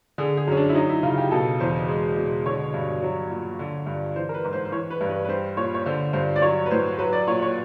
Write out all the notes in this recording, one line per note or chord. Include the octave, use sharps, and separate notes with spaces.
D3 G#4
G#4
F#2 C#4
D4
E4
F#3 D#4
E4
C#3 F4
G4
B2 A4
E2 C5
G#3
B2
D3 C#5
G2
F#3
A#2
D3
G2
E3 C5
A#4
B4
G#2
C5
C5
E3 C#5
B4
G2
B4
B4
G3 C5
A#2 C#5
C#5
D3 C5
G2 C5
D5
F#3 C#5
B4
A2 C5
F#3 B4
D5
A#2 C#5
C#5